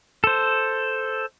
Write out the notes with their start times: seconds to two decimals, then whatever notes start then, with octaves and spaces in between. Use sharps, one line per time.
0.24 A4 C5